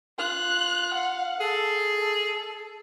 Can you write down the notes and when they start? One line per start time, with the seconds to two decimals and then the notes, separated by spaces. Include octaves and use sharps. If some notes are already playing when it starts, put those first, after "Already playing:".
0.18 F4 F#6
0.94 F5 F#5
1.40 G#4 A4
1.98 A4